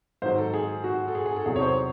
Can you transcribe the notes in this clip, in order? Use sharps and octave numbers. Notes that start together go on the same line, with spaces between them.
G#2 D#3 F#3 C5
A4
G#4
F#4
A4
G#4
G#4
A4
E2 C3 F#3 G#4
C#5
C5